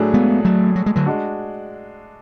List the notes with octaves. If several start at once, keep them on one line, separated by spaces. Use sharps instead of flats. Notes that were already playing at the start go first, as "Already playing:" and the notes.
Already playing: A2 F#3 A3 D4 G#4
G#3 B3
F#3 A3
F#3
G#3
D3 F#3
G#3 D4 F#4